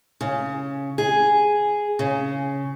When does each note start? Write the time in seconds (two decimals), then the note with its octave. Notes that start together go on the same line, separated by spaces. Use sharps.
0.21 C#3
0.98 G#4
1.99 C#3